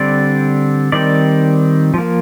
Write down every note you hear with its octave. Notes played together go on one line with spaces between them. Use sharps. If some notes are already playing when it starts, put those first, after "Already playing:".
Already playing: D3 G3 C4 D5
D#3 G3 C4 D5
F3 A#3